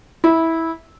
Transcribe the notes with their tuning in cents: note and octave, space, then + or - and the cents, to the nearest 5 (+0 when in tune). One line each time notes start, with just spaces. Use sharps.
E4 -15